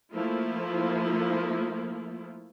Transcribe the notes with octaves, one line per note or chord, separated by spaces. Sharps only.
F3 A3 A#3 E4 F4